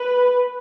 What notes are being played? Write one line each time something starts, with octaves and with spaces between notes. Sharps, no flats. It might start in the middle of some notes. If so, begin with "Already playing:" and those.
Already playing: B4